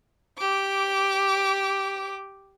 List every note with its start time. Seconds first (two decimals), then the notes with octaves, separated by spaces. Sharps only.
0.38 G4 D6